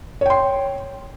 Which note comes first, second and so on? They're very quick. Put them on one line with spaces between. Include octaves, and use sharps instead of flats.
C#5 G5 C6